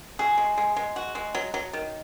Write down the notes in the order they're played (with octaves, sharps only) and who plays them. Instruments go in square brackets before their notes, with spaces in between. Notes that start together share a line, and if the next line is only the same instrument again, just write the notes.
[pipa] F#4 [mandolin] G#4
[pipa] G#3
G#3
G#3
F#4
G#3
F#3
F#3
D#3